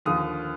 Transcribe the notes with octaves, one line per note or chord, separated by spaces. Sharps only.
D#2 D3 F3 D#6